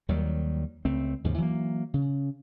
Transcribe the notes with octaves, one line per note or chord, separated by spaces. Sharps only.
D#2 D#3 F#3 G3
C#2 A3 C4
D#2 G#2 C#3 F3
E3 F#3 A3 A#3
C#3